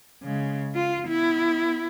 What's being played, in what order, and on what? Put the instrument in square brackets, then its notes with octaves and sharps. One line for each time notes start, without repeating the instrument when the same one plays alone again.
[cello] C#3 G#3
F4
B3 E4